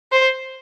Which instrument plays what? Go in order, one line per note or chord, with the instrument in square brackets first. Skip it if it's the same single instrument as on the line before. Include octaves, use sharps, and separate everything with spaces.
[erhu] C5